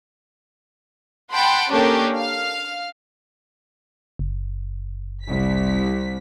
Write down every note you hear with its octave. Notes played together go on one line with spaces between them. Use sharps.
F#5 G5 A5 B5 C6
A#3 C#4 D4 G4 A4 A#4
F5 F6
F#1
C2 B6